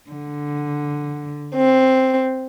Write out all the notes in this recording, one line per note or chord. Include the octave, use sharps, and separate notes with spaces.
D3
C4